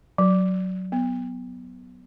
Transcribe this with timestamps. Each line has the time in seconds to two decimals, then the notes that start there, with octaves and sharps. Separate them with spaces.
0.18 F#3
0.92 B3